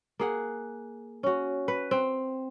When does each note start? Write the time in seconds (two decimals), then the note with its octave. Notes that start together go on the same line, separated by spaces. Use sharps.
0.20 A#3 G#4 F#5
1.23 C#4 F#4
1.68 B4
1.91 C4